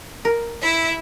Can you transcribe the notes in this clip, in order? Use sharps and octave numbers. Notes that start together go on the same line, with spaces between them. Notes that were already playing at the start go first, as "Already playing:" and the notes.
A#4
E4 E5